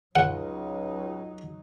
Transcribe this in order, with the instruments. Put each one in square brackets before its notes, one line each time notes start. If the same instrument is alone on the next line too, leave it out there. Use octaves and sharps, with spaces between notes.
[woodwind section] C#2 [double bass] F#3 D#4 [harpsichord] F#5